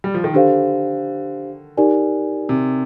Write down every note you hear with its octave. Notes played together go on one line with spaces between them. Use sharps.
G3
F3
D#3
D3 D4 G4 C5 F5
D#4 G4 A#4 D5 G#5
C3